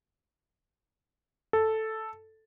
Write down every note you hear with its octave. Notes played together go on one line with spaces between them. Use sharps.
A4